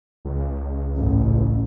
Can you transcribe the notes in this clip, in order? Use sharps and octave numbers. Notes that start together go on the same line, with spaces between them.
C#2
A1